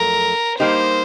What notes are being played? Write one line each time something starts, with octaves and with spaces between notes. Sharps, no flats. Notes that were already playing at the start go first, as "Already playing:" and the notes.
Already playing: F2 F#3 A3 A#4
G3 A#3 D#4 G4 C5